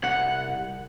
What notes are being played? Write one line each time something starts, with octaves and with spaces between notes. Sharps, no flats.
C2 F#5